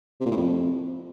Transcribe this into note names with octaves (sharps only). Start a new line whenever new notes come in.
C3
A#2
A2
F2